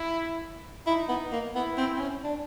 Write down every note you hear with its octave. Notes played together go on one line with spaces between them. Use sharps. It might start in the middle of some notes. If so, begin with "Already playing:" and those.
Already playing: E4
D#4 E4
B3
A#3
B3 E4
C4
C4
C#4
D4